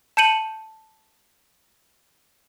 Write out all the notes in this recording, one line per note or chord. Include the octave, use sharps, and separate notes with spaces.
A5 G6 C#7 D#7 F#7